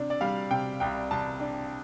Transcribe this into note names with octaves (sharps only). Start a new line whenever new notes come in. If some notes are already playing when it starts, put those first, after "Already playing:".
Already playing: C3 D4
D5
G3 F5
C3 G5
C2 G5
C2 A5
D4